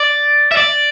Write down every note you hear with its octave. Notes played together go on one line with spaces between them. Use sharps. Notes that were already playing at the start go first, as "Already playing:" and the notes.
Already playing: D5
E5
D5